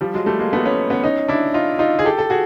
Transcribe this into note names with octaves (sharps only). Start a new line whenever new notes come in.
F3 G3
F#3 G#3
G3 A3
G#3 A#3
A3 B3
B3 C#4
B3 C#4
C#4 D#4
D4 E4
D#4 F4
D#4 F4
G#4
G4 A4
A4
F#4 G#4